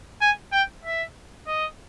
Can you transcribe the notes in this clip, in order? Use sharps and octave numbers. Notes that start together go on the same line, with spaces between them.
G#5
G5
E5
D#5